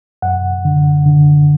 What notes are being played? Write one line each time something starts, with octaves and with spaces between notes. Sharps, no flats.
F#2 F#5
D3
D3